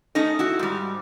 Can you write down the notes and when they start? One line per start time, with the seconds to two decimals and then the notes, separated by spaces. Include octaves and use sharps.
0.15 A3 C#4 D#4 D#5
0.39 E4 F#4
0.59 G#2 G3